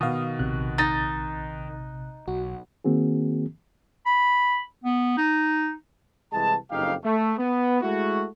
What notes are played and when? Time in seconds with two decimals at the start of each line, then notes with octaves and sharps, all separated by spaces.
0.01 B2 D#3 F5 D#6
0.39 A#1 C3 F#6
0.78 D#4 A6
2.28 B1 F#4
2.85 D#3 A#3 C4 F#4 G#4
4.06 B5
4.84 B3
5.18 D#4
6.32 C2 E3 G#3 A5
6.71 F#1 F2 D#4 G4 F5
7.04 A3
7.38 B3
7.82 G#3 A3 E4 F#4